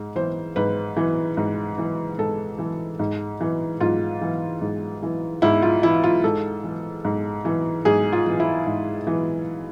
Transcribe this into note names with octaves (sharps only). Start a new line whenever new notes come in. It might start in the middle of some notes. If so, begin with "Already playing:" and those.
Already playing: G#2
E3 C5
G#2 B4
E3
G#2
E3
G#2 A4
E3
G#2
E3
G#2 F4
E3
G#2
E3
G#2 E4
F4
E3 E4
F4
G#2 A4
E3
G#2
E3
G#2 G#4
F4
E3
E4
G#2
E3